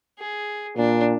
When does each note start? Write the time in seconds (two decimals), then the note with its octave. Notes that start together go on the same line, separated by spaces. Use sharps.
0.19 G#4
0.77 A#2 D4